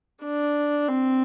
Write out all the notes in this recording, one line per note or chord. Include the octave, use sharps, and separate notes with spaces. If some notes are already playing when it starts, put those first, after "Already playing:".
D4
C4